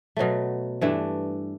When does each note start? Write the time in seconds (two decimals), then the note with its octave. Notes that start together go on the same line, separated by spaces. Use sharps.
0.17 B2 F#3 A3
0.81 G2 E3 A3 D4